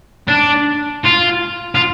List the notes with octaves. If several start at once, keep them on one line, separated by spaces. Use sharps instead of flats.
D4
F4
F4